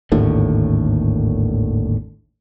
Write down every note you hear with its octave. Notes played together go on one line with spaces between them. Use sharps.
G#1 D#2 A2 D3